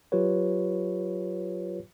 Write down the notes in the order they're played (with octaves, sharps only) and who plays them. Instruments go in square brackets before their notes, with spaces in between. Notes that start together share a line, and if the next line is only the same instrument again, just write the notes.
[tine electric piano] F#3 F4 G4 B4 C#5